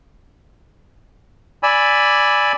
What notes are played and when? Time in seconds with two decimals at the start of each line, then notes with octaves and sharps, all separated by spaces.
1.63 D5 G#5 B5 E6